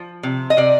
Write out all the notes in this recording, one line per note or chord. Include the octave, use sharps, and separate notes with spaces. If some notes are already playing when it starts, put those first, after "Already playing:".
Already playing: F3
C3
D#5
C3 D5